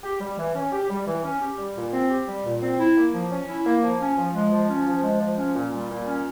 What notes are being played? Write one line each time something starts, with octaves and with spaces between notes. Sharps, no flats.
G4
G3
E3
C#4
G4
G3
E3
C#4
G4
G3
A#2
C4
G4
G3
A#2
C4
E4
A#3
F3
C#4
E4
A#3
F3
C#4
F3
G#3
F3
C#4
F3
G#3
F3
C#4
A#2
G3
A#2
C#4